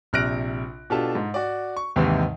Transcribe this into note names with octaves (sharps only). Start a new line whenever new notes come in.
A#1 C3 F6 F#6 A#6 D7
B2 D4 F4 G4 A4 A5
G#2
F#4 D5
C#6
D#2 G#2 C3 D#3 E3